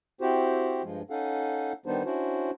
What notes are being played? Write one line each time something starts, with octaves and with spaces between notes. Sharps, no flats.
C4 E4 F#4 G4 C5
G2 F3 G#3
C#4 D#4 A4 F5 F#5
D#3 G3 B3 D4 D#4 C5
C#4 D4 E4 F#4 C5